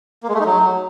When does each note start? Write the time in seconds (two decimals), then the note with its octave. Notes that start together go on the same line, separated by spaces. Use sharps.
0.23 A#3
0.29 G#3
0.34 A3
0.40 D#4
0.46 F#3